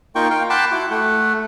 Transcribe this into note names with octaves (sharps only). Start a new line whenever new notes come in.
A#3 D#4 F4 G5 C#6
F5 G5
F#5 G5 A5 B5 C6 D6
E4 F#4 D6
A3 F#5